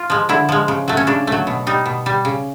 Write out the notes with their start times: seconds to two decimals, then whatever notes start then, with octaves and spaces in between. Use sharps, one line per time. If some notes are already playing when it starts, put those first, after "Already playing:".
Already playing: F4
0.10 F3 G#3
0.29 D3 E4
0.49 F3 G#3
0.68 C#3
0.88 F#3 A3
0.97 C#4
1.07 C#3 D4
1.27 F#3 A3
1.47 B2
1.67 G3 D#4
1.86 B2
2.06 G3
2.25 C#3